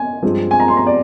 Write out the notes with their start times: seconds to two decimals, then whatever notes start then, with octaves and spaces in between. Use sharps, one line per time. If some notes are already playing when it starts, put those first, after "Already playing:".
Already playing: G#5
0.22 G2 F3 G#3 C4
0.51 G#5
0.60 A#5
0.68 C6
0.77 A#5
0.87 D5